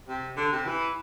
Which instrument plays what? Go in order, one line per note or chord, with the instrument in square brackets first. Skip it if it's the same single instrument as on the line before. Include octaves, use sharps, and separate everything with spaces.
[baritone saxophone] C3
D3
C3
E3